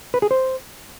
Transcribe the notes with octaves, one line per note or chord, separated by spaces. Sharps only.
B4
G#4
C5